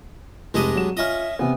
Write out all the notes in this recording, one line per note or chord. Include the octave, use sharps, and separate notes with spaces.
F1 G#3 D4 G4 D#5 D#7
F#3 E7
C#4 F4 D#5 E5 F6
C3 B3 G#5